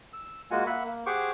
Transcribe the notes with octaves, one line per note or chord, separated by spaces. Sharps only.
E6
G#3 A#3 F4 F#4 F#5 G#5
A#3 E5 F#5 B5
A#3
G4 G#4 C5 F#5 C#6 D6